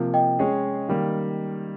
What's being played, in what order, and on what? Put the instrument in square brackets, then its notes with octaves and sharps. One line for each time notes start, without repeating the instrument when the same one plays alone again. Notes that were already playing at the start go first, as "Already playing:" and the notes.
Already playing: [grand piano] C3 F3 A#3
[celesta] D#5 G5
[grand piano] G#3 C#4 G#4
D#3 G3 A#3